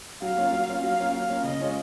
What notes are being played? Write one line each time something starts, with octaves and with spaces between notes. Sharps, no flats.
F#3 F5
A#3 C#4 F4
F#3
A#3 C#4 F4
F#3 F5
A#3 C#4 F4
F#3 F5
A#3 C#4 F4
C#3 D#5
G#3 C#4 F4